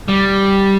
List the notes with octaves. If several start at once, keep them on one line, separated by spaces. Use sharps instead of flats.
G3